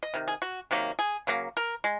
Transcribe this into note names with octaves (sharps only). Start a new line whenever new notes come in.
D#5
C3 D#3
G#4
F#4
C3 D#3 F#3 A#3
G#4
C#3 F#3 A#3
A#4
G#3